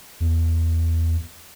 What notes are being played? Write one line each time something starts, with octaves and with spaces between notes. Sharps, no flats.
E2